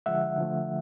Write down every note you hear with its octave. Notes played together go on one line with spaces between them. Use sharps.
D3 F3 G#3 E5 F#5
D3 F3 A3